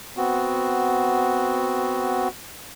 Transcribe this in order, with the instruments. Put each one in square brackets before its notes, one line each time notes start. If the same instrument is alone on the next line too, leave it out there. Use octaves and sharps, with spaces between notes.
[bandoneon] B3 C4 F#4